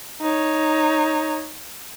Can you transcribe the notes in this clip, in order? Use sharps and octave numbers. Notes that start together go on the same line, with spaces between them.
D#4 C#5